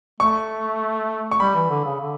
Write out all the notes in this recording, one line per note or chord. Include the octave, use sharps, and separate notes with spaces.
A3 C#6
C#6
G3 B5
E3
D3
C#3
D3